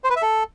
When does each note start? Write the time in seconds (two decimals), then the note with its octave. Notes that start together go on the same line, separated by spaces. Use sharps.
0.04 C5
0.10 B4
0.16 E5
0.22 A4